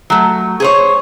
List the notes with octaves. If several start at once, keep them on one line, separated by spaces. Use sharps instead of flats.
F#3 A3
G#4 C5 C#5